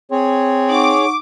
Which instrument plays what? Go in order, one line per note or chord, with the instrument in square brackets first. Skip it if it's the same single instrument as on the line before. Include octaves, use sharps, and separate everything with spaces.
[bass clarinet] C4 [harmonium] G#4 C#5
[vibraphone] D#4 F#5 C#6 [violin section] D6